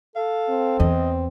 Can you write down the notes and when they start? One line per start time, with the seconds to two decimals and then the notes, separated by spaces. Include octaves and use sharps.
0.16 A4 F5
0.49 C4
0.80 E2 D#5